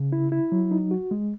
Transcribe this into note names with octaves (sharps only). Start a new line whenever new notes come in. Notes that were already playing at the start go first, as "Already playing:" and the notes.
Already playing: C#3
E4
E4
F#3
D#4
F#4
G#3